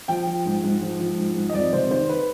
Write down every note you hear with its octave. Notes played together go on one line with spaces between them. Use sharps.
F3 G5
F3
G#2
G#2
F3
F3
G#2
G#2
D#5
F2 D5
C3 C5
D#3 C5
B4